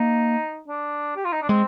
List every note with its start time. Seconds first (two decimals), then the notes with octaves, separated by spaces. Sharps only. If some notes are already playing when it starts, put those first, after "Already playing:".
Already playing: A#3 D#4
0.68 D4
1.16 G4
1.25 F4
1.32 D#4
1.42 D4
1.49 G#3 C4